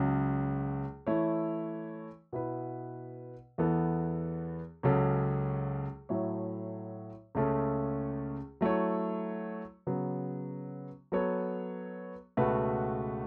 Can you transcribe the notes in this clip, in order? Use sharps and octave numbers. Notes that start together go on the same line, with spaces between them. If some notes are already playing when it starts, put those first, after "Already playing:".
Already playing: C#2 C#3 F#3 C#4
E3 A3 E4 C#5
B2 B3 E4 B4
E2 E3 B3 A4
C#2 C#3 F#3 C#4 A4
A2 F#3 A3 E4 C#5
C#2 C#3 A3 C#4 A4
F#3 A3 E4 C#5
C#3 F#3 B3
F#3 B3 A4 C#5
C#2 B2 A3 F#4 B4